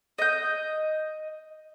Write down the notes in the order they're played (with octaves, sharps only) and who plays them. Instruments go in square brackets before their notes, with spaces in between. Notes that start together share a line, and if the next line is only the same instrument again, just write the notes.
[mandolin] D#5 G6